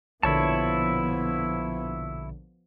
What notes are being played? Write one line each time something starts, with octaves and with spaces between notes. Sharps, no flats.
A#1 B2 D3 F3 B3 E4 C#5 A5